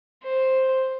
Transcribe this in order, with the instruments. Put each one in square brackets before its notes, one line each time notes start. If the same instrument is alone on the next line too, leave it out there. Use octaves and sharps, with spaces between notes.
[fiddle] C5